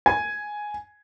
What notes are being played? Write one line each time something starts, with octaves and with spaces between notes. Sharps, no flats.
G#5